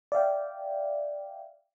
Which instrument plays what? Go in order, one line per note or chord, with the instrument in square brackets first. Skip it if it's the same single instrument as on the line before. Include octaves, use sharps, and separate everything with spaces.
[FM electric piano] D5 E5 F5 G5